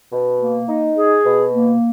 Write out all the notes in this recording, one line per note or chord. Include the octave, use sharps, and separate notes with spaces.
B2
A#3
D#4
G#4
B2
A#3